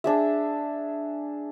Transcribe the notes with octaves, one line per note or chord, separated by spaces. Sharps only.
D4 G#4 E5